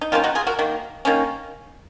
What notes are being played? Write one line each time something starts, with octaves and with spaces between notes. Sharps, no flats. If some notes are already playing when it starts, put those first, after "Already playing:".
D#4
D#3 A#3 C#4 F4
D#4 F#4
F4 G#4
F#4 A#4
D#3 A#3
D#3 A#3 C#4